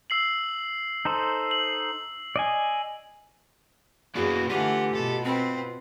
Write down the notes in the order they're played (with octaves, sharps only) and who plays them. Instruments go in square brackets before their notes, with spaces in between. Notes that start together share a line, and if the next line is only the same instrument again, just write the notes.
[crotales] E6 C7 F#7
[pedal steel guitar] D#4 A4 C5
[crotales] F#7
[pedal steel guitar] D5 D#5 G#5
[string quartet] F#2 C#4 G#4 [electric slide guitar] A#3 E4 D5 [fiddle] B3 [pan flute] F#4
[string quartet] D3 E3 A3 [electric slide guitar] F4 [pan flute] G4 [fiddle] F#5
[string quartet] B2 [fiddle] A4
[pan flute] C4 [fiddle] B4 C5